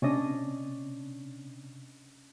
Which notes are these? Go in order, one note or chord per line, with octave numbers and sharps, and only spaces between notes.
C3 C#4 D4 D#5